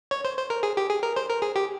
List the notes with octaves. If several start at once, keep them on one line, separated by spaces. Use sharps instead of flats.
C#5
C5
C5
A#4
G#4
G4
G#4
A#4
C5
A#4
G#4
G4